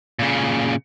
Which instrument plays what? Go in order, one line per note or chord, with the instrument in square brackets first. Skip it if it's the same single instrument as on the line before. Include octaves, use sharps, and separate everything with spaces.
[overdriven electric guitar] A#2 C#3